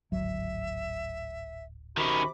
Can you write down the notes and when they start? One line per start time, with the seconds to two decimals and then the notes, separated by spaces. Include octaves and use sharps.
0.12 D1 G#1 F#3 E5
1.97 C3 D#3 C#4 F#4 B5 D6